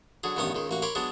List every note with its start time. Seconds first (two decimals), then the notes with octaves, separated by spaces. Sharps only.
0.24 D3 F#3 G#4
0.36 A1 G2 D#3 B3 C#4 D#6
0.55 C#2 D#3 G#3
0.69 A1 A#3 F#4
0.82 A#4 C#5 B5 C6 D6
0.95 F#3 G#3 B3 D4 G#4